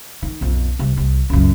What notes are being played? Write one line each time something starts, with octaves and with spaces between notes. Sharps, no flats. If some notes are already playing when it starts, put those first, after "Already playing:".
D#3
B1 F2
C2
C2
C#2 F#2